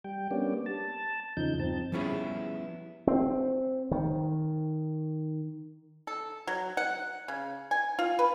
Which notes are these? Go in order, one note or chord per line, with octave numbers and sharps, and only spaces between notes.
G3 G5
G3 A#3 B3 C#4 D4 G4
A5
E2 C#3 F3 D#4 G6
G2 F3 C4 A5
F3 G3 B3 C#4 E4 G#4
C4
D#3
A4
F#3
F#5
C#3
G#5
F4
B4